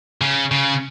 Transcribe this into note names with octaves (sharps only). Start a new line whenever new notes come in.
C#3
C#3